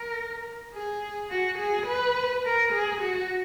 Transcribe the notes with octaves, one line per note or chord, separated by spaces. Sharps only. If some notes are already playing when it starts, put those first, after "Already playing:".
Already playing: A#4
G#4
F#4
G#4
B4
A#4
G#4
F#4